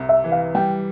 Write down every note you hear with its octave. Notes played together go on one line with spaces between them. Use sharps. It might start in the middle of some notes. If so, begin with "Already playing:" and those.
Already playing: C2 C3
E5
E3
F5
G3 G5